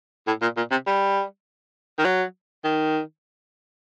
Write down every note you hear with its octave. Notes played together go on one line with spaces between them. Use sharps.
A2
A#2
A#2
C3
G3
D#3
F#3
D#3